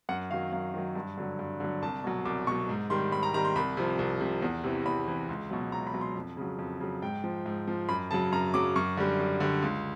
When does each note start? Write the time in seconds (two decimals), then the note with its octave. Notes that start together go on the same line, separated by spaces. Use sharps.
0.09 F#2 F#5
0.30 D#3 F5
0.34 F#3
0.52 F#2 F5
0.74 D#3 F#3
0.95 G2
1.17 D3 F#3
1.39 G2
1.60 D3 F#3
1.82 C2 A5
2.04 B2 F#3
2.25 C2 D6
2.47 B2 C#6
2.51 F#3
2.69 G#2
2.90 D#3 G3 C6
3.12 G#2 B5
3.23 A#5
3.34 D#3 G3 A#5
3.45 C6
3.55 C2 B5
3.77 C3 F3
3.99 C2
4.20 C3 F3
4.42 E2
4.64 C3 E3
4.85 E2 B5
5.08 C3 E3
5.29 C#2
5.51 B2 F#3
5.72 C#2 A#5
5.87 B5
5.93 B2 F#3
6.01 C6
6.15 F2
6.37 C#3 F#3
6.59 F2
6.80 C#3 F#3
7.02 G#2 G5
7.24 F3
7.46 G#2
7.68 F3
7.89 F#2 B5
8.11 C#3 F#3 A5
8.32 F#2 A#5
8.54 C#3 F#3 D6
8.76 F#2 C#6
8.97 D3 G3
9.19 F#2
9.40 D3 G3
9.62 C#2